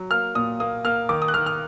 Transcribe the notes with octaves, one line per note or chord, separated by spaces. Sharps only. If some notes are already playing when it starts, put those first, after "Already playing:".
Already playing: F#3
A#3 F6
A#2 D#6
A#3 D#6
A#3 F6
D#3 D6
D#6
F#6
D#3 F6
F6